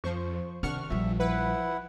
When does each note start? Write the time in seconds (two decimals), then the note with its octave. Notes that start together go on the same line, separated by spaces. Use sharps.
0.04 F2 F3 C5 C#6
0.63 C3 D#3 D4 F#5 C#6 F6
0.90 A#1 F3 G3 E5
1.20 F3 E4 B4 F#5